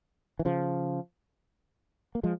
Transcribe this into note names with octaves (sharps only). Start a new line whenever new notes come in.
E3
C#3 F3
A#3
F3 G#3